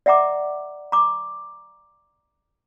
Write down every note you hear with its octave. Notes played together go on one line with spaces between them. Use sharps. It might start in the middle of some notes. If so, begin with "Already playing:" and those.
D5 E5 F#5 A#5 D6
A#5 D6